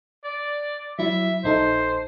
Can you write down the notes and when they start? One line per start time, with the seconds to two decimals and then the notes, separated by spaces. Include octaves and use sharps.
0.24 D5
0.99 F#3 E4 E5
1.44 A#1 D#4 A4 C5